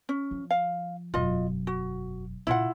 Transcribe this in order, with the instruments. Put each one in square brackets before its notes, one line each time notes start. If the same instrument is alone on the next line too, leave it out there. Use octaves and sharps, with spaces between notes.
[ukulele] C#4
[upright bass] F3
[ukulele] F5
[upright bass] E1 F#2 [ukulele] F4 D#5
[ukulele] F#4
[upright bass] A#2 C#3 [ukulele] E4 F4 F#5